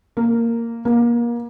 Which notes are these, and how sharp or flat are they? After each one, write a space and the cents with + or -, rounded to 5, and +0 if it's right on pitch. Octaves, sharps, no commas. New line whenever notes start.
A#3 -10
A#3 +30